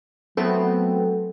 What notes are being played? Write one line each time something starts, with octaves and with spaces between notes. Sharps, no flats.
F#3 A3 B3 C4 A4